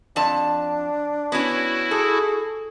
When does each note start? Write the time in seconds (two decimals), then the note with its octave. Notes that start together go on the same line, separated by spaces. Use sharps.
0.16 F2 D4 A5
1.32 B3 C#4 E4 F#4
1.91 G#4 A4